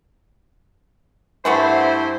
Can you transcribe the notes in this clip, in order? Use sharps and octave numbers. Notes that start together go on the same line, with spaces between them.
G2 E3 A3 B3 E4 C5